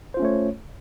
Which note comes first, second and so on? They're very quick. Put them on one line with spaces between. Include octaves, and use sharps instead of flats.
C5 F4 C#4 A3 C#5